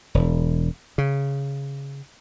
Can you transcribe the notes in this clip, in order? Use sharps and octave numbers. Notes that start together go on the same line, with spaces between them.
E1
C#3